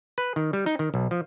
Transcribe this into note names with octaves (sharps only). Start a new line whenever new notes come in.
B4
D#3
G3
D#4
D#3
B1
F3